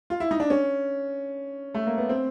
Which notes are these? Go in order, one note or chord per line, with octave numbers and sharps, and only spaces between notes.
F4
E4
D#4
D4
C#4
A3
A#3
B3
C4